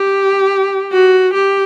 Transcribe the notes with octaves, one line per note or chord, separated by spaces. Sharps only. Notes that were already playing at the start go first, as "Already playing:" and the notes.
Already playing: G4
F#4
G4